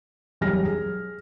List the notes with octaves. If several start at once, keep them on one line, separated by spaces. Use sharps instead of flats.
E1 B1 F#2 G3 F6 A#6
G#4